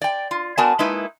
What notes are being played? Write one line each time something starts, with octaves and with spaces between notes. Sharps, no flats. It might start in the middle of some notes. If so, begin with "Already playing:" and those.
D5 G5
F4
B3 F#4 A#4 D5 G#5 A5
G#3 A#3 D#4 E4 B4